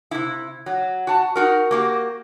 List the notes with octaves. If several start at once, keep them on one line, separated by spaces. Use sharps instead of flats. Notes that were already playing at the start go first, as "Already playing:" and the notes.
C3 E4
F#3
F#4 A5
D#4 F#4 A#4
A#3 F#4 G4